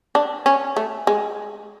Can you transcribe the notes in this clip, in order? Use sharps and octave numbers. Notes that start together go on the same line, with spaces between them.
D4
C#4
A3
G#3